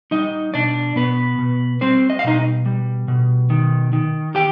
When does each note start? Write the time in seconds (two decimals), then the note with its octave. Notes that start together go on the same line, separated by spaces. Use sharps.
0.11 G3 D#4 D#5
0.54 B2 D4 D5
0.96 B2 B3 B4
1.38 B2
1.81 G3 C4 C5
2.10 D#5
2.19 F5
2.24 B2 D#4 D#5
2.66 G3
3.08 B2
3.50 D#3
3.93 D#3
4.35 G4 G5